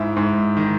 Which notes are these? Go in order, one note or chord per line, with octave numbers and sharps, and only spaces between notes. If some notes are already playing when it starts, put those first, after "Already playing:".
Already playing: G#2 E4 E5
G#2
D#3